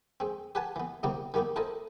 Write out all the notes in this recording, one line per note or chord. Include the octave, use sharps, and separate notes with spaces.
G#3 C4
G4 B4 F#5 G#5 A5
E3 B3
C2 C3 D#3 G3 A#3 B3
D#3 G3 A#3 B3 D#4
E4 A4 A#4 C5 D#5